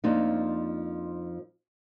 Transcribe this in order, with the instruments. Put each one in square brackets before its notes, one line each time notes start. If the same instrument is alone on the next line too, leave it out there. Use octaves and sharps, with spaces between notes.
[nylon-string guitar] F2 F3 A#3 D4 D#4